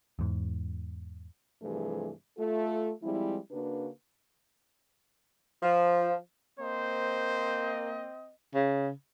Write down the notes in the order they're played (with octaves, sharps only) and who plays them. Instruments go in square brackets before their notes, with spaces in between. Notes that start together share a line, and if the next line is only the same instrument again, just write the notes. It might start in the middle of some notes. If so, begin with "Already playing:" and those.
[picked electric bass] E2 G#2
[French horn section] G2 C3 E3 F3 A3 G#4
A3 F4 A4
F3 G3 G#3 C4 E4
C#3 A#3 D4 F#4 B4
[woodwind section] F3
[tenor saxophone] A#3 [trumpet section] C4 D#5 [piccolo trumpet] C5
[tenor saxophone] C#3